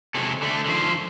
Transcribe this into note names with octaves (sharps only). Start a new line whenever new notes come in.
C3 E3 F#3 G#3 C4 A4
D3 A3 D4
D3 D#3 F3 C5